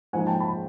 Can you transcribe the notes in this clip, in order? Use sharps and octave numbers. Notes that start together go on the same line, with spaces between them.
G#2 F3 A#3 F#5 G#5
G5 A5
A5 B5